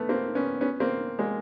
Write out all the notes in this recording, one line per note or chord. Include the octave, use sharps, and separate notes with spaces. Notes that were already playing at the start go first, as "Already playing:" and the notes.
Already playing: A3 B3
A#3 C4
B3 C#4
B3 C#4
A#3 C4
G#3 A#3